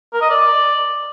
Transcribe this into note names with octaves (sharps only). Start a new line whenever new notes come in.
A#4
D#5
D5